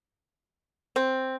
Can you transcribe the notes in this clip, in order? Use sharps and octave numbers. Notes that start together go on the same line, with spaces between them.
C4